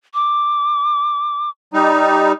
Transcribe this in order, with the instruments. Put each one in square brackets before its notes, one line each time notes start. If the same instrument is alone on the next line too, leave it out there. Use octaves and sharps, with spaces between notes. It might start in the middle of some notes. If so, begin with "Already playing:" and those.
[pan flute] D6
[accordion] G3 D#4